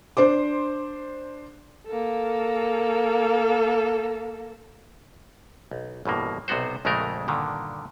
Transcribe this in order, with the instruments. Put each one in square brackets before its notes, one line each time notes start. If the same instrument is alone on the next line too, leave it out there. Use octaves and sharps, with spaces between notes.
[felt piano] D4 C5 C6 D6
[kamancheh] A#3 A4
[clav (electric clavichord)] B1
A1 G2 B2 A#3
B1 C3 B3 F#4 C5
A#1 F2 C#3 G#3 A3 A#4
G2 A#2 D3 D#3